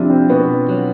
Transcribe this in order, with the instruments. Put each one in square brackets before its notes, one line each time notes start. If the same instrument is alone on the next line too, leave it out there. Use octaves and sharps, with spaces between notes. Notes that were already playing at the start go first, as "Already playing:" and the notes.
Already playing: [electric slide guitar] F2 C3 [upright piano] D4 E4 F4
[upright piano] C4
[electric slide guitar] B2 [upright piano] B3
[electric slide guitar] F#3